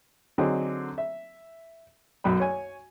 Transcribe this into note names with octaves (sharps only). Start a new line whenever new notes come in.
D3 F#3 C4 D#4 G#4
E5
B1 F#2 B5
C#5 G#5